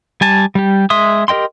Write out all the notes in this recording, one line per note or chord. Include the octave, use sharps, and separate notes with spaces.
G3 G#5 A5
G3 G4
G#3 E5 C6 D#6
G4 A#4 D#5 G5 C6